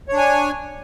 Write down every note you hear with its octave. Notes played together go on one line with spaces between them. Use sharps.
D4 C#5 G#5